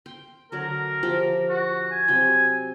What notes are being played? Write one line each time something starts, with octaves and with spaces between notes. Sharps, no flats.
G5 C6
D3 F#3 D4 A#4
F3 G4 C6
F#4
G#5
C3 F#3 G5